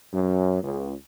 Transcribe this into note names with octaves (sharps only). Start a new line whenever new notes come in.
F#2
C#2